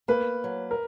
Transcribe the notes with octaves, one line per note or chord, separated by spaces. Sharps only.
A#3 B4
F#3
A#4